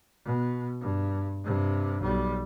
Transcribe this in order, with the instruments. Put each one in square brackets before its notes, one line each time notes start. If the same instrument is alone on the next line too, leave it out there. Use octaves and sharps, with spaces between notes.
[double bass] B2
G2
G2 C3
B1 G3